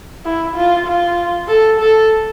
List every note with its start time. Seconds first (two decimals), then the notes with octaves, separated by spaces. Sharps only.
0.25 E4
0.56 F4
0.87 F4
1.48 A4
1.80 A4